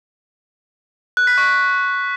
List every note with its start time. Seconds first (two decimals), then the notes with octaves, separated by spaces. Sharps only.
1.17 F#6
1.27 B6
1.38 C#6